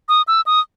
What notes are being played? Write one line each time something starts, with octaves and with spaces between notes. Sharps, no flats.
D#6
E6
D#6